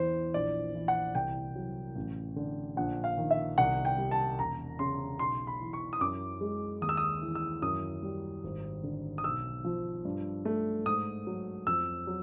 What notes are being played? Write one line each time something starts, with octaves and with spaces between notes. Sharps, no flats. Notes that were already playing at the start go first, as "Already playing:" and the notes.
Already playing: E2 E3 C5
A#1 D5
E3
F#5
C2 G5
F#3
A1
D3
A#1 F#5
F5
D#3
E5
C2 F#5
G5
G3
A5
E1 A#5
C#3 C6
B1 C6
B5
E3
C#6
D#6
F#2 D6
G#3
D#2 D#6
E6
D#6
E3
E6
F#2 D#6
G3
G#1
D3
D#6
B1 E6
F3
G2
A3
G#2 D#6
F#3
F2 E6
F#3